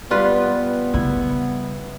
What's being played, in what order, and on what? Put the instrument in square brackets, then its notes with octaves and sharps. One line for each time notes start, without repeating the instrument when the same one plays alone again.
[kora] G3 F4 B4 [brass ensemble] B3
[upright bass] C#3 G3 [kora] E4